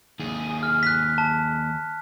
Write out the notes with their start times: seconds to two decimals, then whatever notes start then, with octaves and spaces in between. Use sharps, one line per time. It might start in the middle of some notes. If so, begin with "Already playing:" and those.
0.20 D#2 G#4
0.63 F6
0.83 F#6 B6
1.18 A5